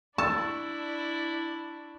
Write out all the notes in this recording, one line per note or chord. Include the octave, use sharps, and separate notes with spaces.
D4 E4 D5 A5 C#6 E6 A6